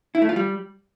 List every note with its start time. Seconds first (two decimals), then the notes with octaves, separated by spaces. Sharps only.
0.15 E4
0.22 A3
0.29 F4
0.36 G3